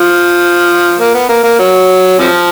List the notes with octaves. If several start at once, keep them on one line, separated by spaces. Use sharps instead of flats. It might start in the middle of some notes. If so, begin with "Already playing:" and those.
Already playing: F3
A#3
B3
A#3
A#3
F#3
C3 F3